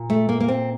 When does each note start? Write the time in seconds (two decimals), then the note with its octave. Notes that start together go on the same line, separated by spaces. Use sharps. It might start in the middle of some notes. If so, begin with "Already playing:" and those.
Already playing: A#2
0.10 A3
0.29 A#3
0.40 A#3
0.48 C4